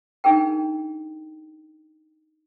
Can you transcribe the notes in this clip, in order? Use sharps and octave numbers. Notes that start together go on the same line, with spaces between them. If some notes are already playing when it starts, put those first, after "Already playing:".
D4 D#4 G#4 A#4 G5